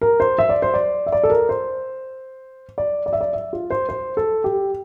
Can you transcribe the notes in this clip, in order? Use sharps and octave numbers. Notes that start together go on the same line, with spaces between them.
A#4
C5
E5
D5
C5
D5
E5
D5
A4
A#4
C5
D5
D5
E5
D5
E5
F4
C5
C5
A4
G4